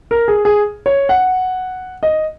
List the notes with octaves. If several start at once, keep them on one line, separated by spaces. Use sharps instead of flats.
A#4
G#4
G#4
C#5
F#5
D#5